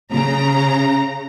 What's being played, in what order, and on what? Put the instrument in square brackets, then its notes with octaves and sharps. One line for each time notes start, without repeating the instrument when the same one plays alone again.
[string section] C#3 A#5